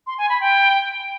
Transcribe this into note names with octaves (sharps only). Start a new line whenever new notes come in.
C6
G#5
B5
G5